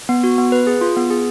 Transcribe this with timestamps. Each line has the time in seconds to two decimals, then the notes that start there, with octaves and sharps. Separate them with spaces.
0.09 B3
0.24 F#4
0.38 B3
0.52 B4
0.67 G#4
0.81 F4
0.96 B3
1.10 G#4